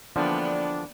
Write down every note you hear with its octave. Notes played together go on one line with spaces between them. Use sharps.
D3 E3 F3 A#3 B3 D4 D5 G5